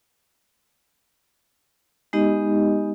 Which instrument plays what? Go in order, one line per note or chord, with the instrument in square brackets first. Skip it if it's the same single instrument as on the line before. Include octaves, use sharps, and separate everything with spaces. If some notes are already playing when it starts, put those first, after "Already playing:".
[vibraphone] G#3 B3 D#4 G4 D#5